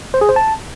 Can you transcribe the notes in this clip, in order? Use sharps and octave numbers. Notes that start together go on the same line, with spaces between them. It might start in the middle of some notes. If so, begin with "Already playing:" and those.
C5
G#4
C5
A5